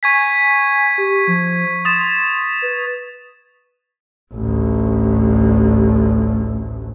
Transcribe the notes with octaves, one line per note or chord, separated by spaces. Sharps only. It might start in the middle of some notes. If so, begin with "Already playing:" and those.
G#5 C#6 G#6 B6
G4
F3
C6 D#6 A6 E7
B4
A1 D2